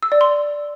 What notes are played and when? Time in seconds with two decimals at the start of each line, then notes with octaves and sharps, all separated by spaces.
0.03 E6
0.12 D5
0.21 C6